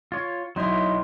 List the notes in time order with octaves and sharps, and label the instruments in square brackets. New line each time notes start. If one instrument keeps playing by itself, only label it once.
[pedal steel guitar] F4 C#5
[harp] B1 C6 [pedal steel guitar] F#3 D#4 E4